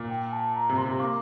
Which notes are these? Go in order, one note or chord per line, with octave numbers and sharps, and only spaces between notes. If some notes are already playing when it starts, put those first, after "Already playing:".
Already playing: A#2
G5
A5
A#5
C3
C6
C3
A#3 D6